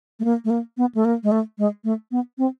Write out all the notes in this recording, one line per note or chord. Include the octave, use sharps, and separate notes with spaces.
A3
A#3
A3
A#3
B3
A3
A#3
G#3
A3
G#3
A3
B3
C4